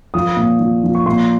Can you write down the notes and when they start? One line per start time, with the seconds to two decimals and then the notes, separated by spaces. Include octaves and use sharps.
0.14 F3 D#6
0.37 A#2
0.60 F3
0.84 F3
0.95 C#6
1.06 A#2 C6